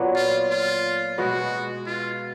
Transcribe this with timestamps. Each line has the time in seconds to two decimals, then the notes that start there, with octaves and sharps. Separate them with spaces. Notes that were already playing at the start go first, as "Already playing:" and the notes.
Already playing: A#2 F#3 B3
0.16 F4
0.50 F4
1.18 B2 G#3 B3 F#4
1.86 F4